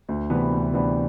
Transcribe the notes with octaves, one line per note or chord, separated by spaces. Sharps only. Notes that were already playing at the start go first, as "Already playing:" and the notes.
D2
C3 E3 B3 D4
D2
C3 E3 B3 D4